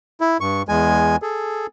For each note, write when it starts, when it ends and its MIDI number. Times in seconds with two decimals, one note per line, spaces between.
0.21 0.37 64
0.41 0.62 43
0.41 0.62 85
0.69 1.16 40
0.69 1.16 56
0.69 1.16 80
1.22 1.67 68
1.22 1.67 69